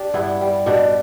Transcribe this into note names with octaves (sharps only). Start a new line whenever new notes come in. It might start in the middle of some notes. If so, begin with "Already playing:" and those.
Already playing: D4 G4
G2 B3 E4
G3
B2 D4 G4